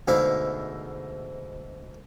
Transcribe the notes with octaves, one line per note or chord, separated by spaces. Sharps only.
D2 G#2 B2 E4 F5 D6